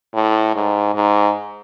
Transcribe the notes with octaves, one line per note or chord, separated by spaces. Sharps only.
A2
G#2
G#2